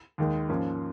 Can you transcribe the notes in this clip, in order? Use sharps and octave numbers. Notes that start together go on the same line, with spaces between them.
D#2 D#3 G#3
G#2 F3 A#3 C#4